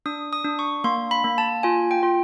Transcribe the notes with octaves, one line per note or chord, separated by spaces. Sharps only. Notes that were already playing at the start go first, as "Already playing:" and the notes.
D4 D#6
D#6
D4
C#6
A#3 C6
B5
A#3
A5
F4 G#5
G5
F4